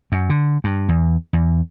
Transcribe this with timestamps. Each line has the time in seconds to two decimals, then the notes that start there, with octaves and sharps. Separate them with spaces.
0.12 F#2
0.30 D3
0.64 G2
0.89 E2
1.33 E2